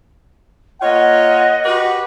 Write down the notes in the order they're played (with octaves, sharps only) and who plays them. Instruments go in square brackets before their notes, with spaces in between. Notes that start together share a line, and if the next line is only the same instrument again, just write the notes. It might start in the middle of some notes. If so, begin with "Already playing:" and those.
[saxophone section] A#3 F4 C#5 [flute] D#5 [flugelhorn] F#5
[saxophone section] F#4 G4 B4